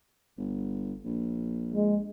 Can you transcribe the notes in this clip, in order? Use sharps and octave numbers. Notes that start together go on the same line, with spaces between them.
G1
A#1
G#3